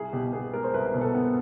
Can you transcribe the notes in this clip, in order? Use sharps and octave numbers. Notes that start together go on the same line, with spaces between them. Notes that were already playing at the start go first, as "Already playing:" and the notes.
Already playing: C2 G#4
B2 G4
B3 G#4
G#3 A#4
C5
C2 B4
B2
A4
B3